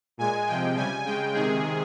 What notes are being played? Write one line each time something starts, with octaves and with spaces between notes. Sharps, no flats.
A#2 G#3 G#5
C3 F3 G#3 G5
C#3 G3 G#5
C#3 G#3 G5
C3 D#3 G#3 G#4